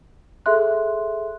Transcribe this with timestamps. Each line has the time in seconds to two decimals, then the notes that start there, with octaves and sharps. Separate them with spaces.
0.46 G#4 A4 E5 C6 F#6